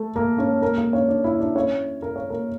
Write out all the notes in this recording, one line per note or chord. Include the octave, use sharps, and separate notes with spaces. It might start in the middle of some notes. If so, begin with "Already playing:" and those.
Already playing: A3 A4
A#3 A#4
C#4 C#5
A#3 A#4
A#3 A#4
C#4 C#5
D4 D5
E4 E5
D4 D5
C#4 C#5
A#4
C#5
A#3 A#4